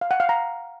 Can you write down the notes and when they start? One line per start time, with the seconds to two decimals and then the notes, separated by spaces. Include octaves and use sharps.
0.01 F5
0.11 F#5
0.20 F5
0.29 A#5